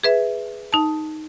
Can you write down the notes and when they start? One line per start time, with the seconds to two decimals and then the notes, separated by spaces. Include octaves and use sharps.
0.04 G#4 B4 E5
0.72 D#4 A5